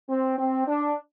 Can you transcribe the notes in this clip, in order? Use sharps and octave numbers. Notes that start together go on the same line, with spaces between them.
C4
C4
D4